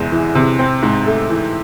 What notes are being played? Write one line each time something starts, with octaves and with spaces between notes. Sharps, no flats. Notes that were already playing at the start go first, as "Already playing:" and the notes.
Already playing: E2 C3 G#3
E3
C3
C4
G#2
A3
E3